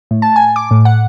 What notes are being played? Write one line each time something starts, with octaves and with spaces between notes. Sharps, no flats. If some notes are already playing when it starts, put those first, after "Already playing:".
A2
A5
G#5
D6
A2
F#5